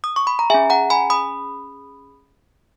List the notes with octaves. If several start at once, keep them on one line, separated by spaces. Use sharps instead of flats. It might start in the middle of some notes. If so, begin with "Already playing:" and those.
D#6
C#6
B5
A#5
C#4 G#4 E5 G#5
F#5 A#5
G#5 B5
B5 D#6